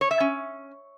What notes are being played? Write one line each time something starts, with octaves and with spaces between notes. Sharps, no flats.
C#5
E5
C#4